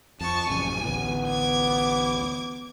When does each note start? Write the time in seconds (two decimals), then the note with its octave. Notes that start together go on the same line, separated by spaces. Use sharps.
0.21 F2 A5 C#6
0.50 A1 F#2 C#3 G#5
0.84 A1 D2 A2 B3
1.28 D6 G#6